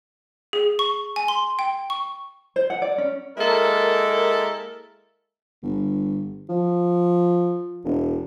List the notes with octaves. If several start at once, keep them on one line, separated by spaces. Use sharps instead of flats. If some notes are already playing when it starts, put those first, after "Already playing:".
G#4
C#6
G#5
C6
G5
C#6
C5
F#5
D5
C#4
G#3 A#3 E4 A4 A#4
G1
F3
E1